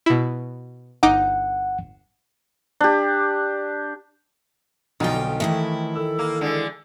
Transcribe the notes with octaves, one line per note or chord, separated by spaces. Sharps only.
B2 E4
G1 D#4 F#5 D6
D4 G4
B1 F2 D3 D#4 F4 G5
D#3 E3 A3 E4
A4 E6
A#3
D3 G#3